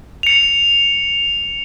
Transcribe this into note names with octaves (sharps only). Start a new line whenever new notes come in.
C#7 F7